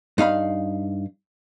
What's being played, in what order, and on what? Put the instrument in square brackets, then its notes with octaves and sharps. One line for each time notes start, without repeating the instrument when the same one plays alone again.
[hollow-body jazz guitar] G2 D#4 F5 B5